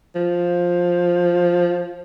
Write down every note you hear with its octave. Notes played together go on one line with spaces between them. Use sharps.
F3